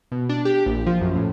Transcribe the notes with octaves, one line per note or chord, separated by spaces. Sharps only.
B2
D4
G4
A#1
F3
F#2
A2